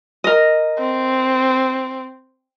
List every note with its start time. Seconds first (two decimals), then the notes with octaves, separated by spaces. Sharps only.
0.24 A#4 D#5
0.79 C4